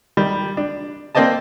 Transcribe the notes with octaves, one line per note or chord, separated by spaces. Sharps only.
D#3 G3
D4
A#3 C4 C5 D5 D#5 A5